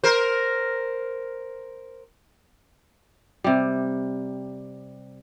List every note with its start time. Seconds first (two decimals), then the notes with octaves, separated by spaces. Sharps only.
0.04 A#4 C5
3.44 C3 G3